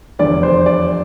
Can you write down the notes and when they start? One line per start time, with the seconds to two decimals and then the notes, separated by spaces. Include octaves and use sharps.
0.19 F1 E2 D3 D5
0.43 C5
0.66 D5